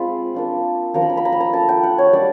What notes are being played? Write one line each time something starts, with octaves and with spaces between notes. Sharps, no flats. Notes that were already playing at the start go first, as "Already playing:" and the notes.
Already playing: G#3 C4 F4 B5
A#3 D4 F4
F3 A#3 D4 F4 A#5
B5
A#5
B5
A#5
B5
A#5
A3 D4 F4 A5
G5
F#5
C#5
G3 A#3 D4 D5